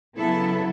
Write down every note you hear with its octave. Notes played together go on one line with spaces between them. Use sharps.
C#3 F#3 B3 E4 A4